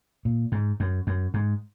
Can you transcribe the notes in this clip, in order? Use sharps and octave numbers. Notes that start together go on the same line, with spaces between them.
A#2
G#2
F#2
F#2
G#2